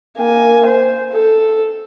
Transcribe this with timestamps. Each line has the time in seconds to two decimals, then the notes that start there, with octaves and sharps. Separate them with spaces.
0.17 A#3 G#5
0.66 C5
1.13 A4